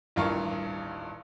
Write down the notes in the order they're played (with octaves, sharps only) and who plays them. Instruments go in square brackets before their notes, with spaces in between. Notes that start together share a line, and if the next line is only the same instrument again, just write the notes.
[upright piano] D#1 A1 G2 F4 A#4 C#6